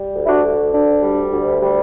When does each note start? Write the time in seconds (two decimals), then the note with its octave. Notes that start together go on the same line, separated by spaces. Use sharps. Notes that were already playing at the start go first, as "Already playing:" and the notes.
Already playing: G3
0.14 D2
0.24 E4
0.28 D4 F#4
0.43 D3
0.73 D2 D4
1.03 G3
1.33 D2
1.62 G3